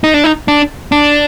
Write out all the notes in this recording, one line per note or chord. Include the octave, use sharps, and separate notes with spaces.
D#4
D4
D#4
D4
D4